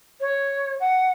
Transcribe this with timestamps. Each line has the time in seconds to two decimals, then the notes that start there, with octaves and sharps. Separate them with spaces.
0.21 C#5
0.80 F#5